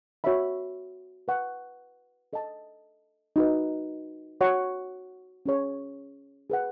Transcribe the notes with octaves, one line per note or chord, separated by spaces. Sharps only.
F#4 C#5 E5 B5
B4 F#5 C#6
A4 D#5 A5
D#4 F#4 B4
F#4 C#5 F#5 C#6
C#4 G#4 C#5
G#4 B4 F#5